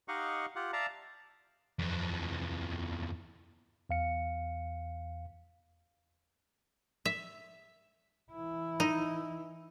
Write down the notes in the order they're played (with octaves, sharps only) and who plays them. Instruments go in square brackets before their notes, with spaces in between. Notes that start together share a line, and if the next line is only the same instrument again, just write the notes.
[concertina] D#4 G4 D#5 F5 F#5 C#6
F4 G4 F#5
D5 E5 F5 A5 A#5
[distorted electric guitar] F2 E3
[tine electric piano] E2 F5 C#7
[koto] E5
[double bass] E3 E4
[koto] D#4